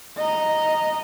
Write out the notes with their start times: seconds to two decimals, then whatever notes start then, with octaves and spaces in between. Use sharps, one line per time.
0.17 D#5 A#5